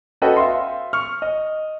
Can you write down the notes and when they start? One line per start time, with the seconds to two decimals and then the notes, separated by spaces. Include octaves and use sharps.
0.22 C#4 F#4 A4 B4 D#5 G5
0.37 E5 F5 C6
0.93 C#6 F6
1.22 D#5